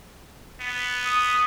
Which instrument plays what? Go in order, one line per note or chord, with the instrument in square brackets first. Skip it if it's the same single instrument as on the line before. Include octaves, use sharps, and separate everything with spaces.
[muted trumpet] B3
[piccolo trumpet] D#6